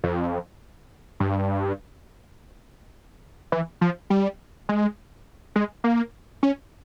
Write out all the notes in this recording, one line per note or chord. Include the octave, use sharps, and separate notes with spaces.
F2
G2
E3
F3
G3
G#3
G#3
A#3
C#4